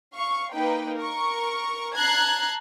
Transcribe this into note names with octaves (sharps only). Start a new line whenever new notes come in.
F5 C#6
A#3 D#4 B4 G5
A#4 C#6
A5 A#5 F#6 G#6 A#6 C7